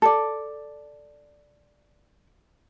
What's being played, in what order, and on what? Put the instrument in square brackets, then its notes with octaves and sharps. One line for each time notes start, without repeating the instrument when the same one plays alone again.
[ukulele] A4 D5